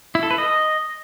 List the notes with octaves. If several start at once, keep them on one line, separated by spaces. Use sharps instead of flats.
E4
A4
B4
D#5